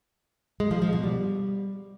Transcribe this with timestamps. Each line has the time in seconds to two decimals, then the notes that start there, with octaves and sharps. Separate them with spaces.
0.60 G#3
0.71 F3
0.82 F3
0.93 B2
1.03 G3